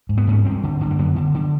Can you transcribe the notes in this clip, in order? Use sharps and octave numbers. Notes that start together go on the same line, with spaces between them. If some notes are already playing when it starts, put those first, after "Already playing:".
G#2
B3
G#2 C#4
G2 C4
D3
D3
A#3
F#2 B3
D3
D3